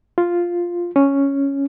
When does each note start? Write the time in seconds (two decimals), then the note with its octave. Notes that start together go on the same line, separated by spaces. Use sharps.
0.18 F4
0.96 C#4